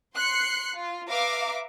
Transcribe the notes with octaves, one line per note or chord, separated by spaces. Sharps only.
C6 F#6 C7 C#7
F4
B4 E5 F5 A#5 D6